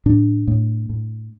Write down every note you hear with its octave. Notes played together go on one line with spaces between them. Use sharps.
A2 D4
A2
A2